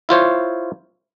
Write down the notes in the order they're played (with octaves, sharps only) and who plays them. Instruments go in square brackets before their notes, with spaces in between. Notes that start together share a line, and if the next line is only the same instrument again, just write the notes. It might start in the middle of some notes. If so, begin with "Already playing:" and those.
[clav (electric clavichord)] E4 F4 C5 C#5